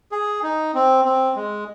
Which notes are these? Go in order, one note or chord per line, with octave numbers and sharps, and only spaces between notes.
G#4
D#4
C4
C4
G#3